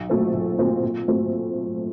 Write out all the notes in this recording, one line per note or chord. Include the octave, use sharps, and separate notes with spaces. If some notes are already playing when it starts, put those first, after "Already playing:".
Already playing: B1
A#2 F#3 A3 C4
B1
A#2 F#3 A3 C4
A#2
F#3 A3 C4